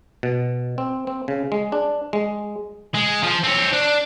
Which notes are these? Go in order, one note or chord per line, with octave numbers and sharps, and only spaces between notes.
B2
C4
C4
C#3
G#3
D4
G#3
G#3
F3
C4 C#5
D4